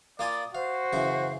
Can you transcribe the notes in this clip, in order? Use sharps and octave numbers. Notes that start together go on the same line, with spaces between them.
A#3 F4 D5 G#5 D#6
F#4 C5 F5
F#2 C#3 E3